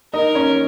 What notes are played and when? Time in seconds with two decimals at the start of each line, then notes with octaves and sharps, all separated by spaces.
0.14 D#4 A#4 D#5
0.35 C#4 C#5